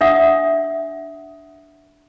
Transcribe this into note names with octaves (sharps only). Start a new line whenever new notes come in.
D4 E5 F#5 D#6